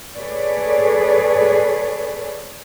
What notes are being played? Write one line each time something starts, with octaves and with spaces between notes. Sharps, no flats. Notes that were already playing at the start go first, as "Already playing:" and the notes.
G#4 A4 B4 C#5 D5